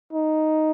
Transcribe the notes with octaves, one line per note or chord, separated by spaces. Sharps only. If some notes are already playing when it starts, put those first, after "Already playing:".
D#4